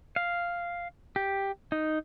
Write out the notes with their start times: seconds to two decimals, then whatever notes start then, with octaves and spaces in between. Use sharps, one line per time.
0.16 F5
1.16 G4
1.72 D#4